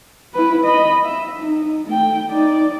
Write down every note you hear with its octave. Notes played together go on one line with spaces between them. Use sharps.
E4 B4
D#5 B5
E5
D#4
A3 G5
D#4 D5